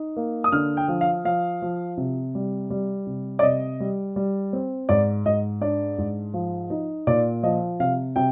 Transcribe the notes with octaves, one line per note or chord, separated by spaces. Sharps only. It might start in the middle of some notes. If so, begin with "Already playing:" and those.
Already playing: D#4
A#3
D#6
D3 F6
G5
F3
F5
F3 F5
F3
C3
G3
G3
C3
D5
C3 D#5
G3
G3
C4
G#2 D5
G#2 D#5
D4 D5
G#2
F3
D#4
A#2 D5
F3 D#5
C3 F5
C3 G5